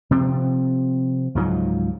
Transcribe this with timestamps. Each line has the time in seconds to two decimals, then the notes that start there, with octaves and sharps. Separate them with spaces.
0.11 C3 F3 C4
1.35 C#2 G#2 F3 F#3